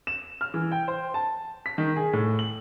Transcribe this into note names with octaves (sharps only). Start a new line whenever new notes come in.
E7
F6
E3
G5
C5
A5
B6
D#3
G#4
A2
F#7